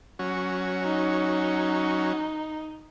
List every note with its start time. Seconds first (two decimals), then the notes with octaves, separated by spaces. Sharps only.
0.19 F#3 C#4
0.84 D#4